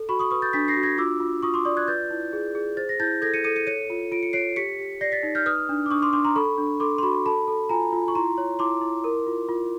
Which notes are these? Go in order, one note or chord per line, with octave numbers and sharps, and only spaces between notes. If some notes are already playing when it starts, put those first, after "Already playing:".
Already playing: A4
F#4 B5 C#6
C#6 D#6
B4 C#6 D#6
G6 A6
D4 A6 B6
A#6 C7
F#4
G#6 A#6
F4 D6 E6
F4
F4 C#6 D#6
C6 D6
D5 C#6 D#6
F#6 G#6
B4 G6 A6
E4
G#4
G#4
C5 A6
A#6
E4 G6 A6
A4 G#6 A#6
C#7 D#7
A4 C#7 D#7
C#7 D#7
C#5 C#7 D#7
F4
F4 D7
C#7
C#5 C7 D7
G4 B6 C#7
G4
D5 A#6 C7
A6 B6
D#4
F6 G6
B4 D#6 F6
D4
D6
D4 C#6 D#6
C6 D6
D4 C6 D6
A#5 C6
A4 B5 C#6
D4
A4 C6 D6
C6
F#4 B5 C#6
A4 A5 B5
A4
F4 G#5 A#5
F4
C#6
E4 A#5 C6
C#5
E4 C6 D6
E4
A#4
F4
F4